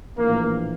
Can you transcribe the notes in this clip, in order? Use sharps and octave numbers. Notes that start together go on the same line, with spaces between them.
A#1 A2 E3 A#3